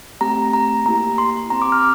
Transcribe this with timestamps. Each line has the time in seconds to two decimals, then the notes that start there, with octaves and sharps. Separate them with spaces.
0.21 A3 C4 G4 A#5
0.53 A#5
0.86 A#3 E4 G4 A#5
1.18 C6
1.50 C4 G4 A#5
1.62 D6
1.72 F6